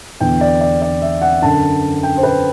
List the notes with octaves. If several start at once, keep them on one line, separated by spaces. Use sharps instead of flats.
E2 D3 G5
D5
D5
D5
E5
F#5
F#2 D3 A5
G5
C5
B4